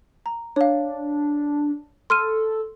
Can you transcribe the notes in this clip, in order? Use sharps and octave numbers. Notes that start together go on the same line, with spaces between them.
A#5
D4 C#5 F5
A4 C6 F6 D#7